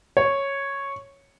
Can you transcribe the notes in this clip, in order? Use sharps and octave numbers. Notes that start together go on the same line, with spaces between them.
C#5